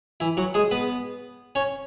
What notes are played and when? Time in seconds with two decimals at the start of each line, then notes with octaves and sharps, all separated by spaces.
0.20 E3 E4
0.37 F#3 F#4
0.54 G#3 G#4
0.71 B3 B4
1.55 C#4 C#5